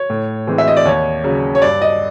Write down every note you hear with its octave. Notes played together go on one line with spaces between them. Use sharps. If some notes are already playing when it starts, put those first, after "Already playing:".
Already playing: C#5
A2
E3 G#3 C4
E5
D#5
D5
D#2 C#5
C#3 F#3
C#5
G2 D5
D#5